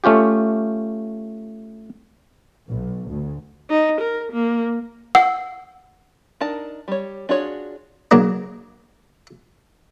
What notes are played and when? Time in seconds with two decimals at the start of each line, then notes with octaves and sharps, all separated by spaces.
0.04 A3 C#4 F4 G4
2.69 B1
3.09 D2
3.70 D#4
4.01 A#4
4.32 A#3
5.15 F#5 E6
6.41 D4 D#4 A#4 A5
6.88 G3 C#5
7.29 D4 F4 F#4 G#4 C#5
8.11 C#3 F#3 A#3 D4